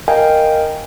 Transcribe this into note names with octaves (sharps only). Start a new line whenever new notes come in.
A#4 D#5 F5 G5 G#5